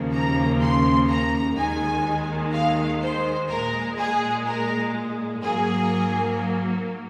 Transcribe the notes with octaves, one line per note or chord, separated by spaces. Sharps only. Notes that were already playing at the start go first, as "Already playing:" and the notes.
Already playing: D#2 C#3 F3 A#3
A#5
C6
A#5
D#2 D#3 G#3 G#5
F5
C5
A#2 G#3 A#4
G#4
A#4
G#2 F#3 A#3 G#4